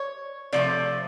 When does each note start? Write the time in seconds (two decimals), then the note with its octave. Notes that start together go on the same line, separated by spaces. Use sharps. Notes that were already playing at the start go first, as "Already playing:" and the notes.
Already playing: C#5
0.53 C3 F3 A3 D5